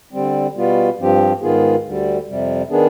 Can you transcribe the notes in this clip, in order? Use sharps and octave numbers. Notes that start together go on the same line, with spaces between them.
D3 G3 C4
B2 G3 B3 F4
G2 F3 C4 G4
G#2 D#3 B3 F4 G#4
D2 D3 G3
F2 C3 G3
D#3 B3 D4 G#4